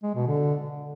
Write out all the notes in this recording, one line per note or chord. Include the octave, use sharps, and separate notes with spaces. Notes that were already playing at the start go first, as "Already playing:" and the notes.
G#3
B2
D3